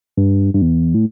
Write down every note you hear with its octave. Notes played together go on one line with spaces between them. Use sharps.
G2
G2
E2
A2